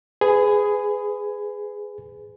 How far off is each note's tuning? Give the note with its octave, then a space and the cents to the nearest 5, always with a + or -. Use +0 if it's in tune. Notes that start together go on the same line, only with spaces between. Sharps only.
G#4 +0 B4 +25